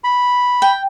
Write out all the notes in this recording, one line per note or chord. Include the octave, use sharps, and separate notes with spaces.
B5
G5